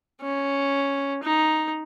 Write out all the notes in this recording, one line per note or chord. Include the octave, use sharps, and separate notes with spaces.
C#4
D#4